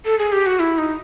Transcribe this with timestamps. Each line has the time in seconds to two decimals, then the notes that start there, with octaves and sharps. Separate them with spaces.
0.05 A4
0.19 G#4
0.32 G4
0.46 F#4
0.60 E4
0.78 D#4